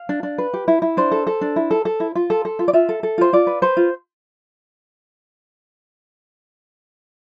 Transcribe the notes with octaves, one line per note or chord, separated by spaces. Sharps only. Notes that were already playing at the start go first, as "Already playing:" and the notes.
Already playing: F5
D4
D4
B4
G4
E4
E4
D4 C5
A4
A4
D4
E4
A4
A4
E4
F4
A4
A4
F4
D5
F4 E5
A4
A4
F4 C5
F4 D5
B4
B4 C5
F4